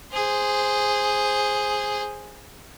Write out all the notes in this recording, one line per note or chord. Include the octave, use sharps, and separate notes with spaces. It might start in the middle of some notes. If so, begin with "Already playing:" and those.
G#4 C5